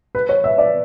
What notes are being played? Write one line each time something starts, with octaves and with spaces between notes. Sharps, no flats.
B4
C#5
E5
D5